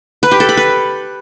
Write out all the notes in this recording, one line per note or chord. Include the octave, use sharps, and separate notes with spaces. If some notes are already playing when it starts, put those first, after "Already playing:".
B4
G4
A4
B5
B4